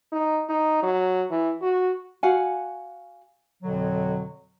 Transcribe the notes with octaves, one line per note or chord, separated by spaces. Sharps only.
D#4
D#4
F#3
E3
F#4
F#4 F5 F#5 G#5
F2 B2 D3 F#3